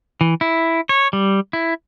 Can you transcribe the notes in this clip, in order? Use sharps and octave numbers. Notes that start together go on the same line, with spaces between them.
E3
E4
C#5
G3
E4